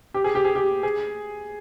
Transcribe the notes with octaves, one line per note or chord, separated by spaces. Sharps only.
G4
G#4
G4
G#4
G4
G#4